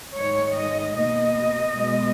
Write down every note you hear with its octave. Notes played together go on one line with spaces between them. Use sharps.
G#2 D#3 G#3 C#5
D#5
B2 A#3 D#5
B2 G#3